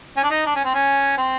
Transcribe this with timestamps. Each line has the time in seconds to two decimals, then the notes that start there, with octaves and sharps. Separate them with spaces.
0.17 C#4
0.23 D4
0.30 D#4
0.46 D4
0.55 C#4
0.65 C4
0.74 C#4
1.18 C4